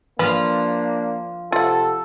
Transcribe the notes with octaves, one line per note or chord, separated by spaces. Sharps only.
F3 A#3 D4 F4 B4 F5
C3 F4 A4 F#5